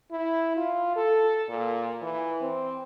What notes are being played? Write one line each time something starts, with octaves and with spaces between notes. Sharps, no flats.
E4
F4
A4
A#2
E3
C4